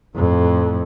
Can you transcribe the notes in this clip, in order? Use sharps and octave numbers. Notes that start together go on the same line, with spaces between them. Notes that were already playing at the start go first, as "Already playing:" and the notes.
F2 A2